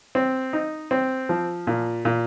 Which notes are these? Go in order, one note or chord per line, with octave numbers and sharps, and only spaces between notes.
C4
D#4
C4
F3
A#2
A#2